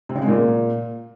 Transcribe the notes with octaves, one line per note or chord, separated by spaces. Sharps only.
C3
C#3
G#3
A#2